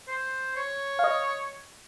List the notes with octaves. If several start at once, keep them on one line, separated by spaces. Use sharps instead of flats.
C5
C#5
F5
D#5